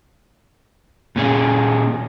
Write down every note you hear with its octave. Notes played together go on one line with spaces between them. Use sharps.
A#2 C#4 G#4